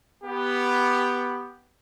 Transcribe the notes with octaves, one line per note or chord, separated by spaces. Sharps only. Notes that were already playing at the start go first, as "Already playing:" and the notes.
B3 G4